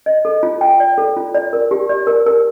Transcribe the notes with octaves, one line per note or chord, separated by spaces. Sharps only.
D#5
A4
F4
G5
D5
A4
F4
D5
A#4
G4
D5
A#4
A#4